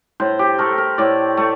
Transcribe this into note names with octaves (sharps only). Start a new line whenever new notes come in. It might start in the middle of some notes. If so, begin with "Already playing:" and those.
A2 C5
G4
A3 A#4
A#4
A2 D5
A3